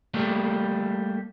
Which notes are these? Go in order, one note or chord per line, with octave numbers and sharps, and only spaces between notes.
G3 A3 A#3